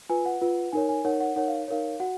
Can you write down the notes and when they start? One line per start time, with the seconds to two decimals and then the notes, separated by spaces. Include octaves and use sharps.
0.09 F4 B4 G#5
0.26 F#5
0.41 F4 B4
0.72 D#4 A#4 C#5 G#5
0.89 G#5
1.05 D#4 A#4 C#5 F#5
1.20 F#5
1.36 D#4 A#4 C#5 F#5
1.48 F5
1.68 D#4 A#4 C#5 F5
2.00 F#4 F#5